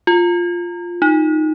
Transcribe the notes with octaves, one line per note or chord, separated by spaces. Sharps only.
F4
D#4